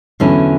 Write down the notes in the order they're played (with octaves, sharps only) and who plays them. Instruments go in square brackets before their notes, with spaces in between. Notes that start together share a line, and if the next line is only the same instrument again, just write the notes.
[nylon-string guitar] E2 D3 F#3 C#4 E4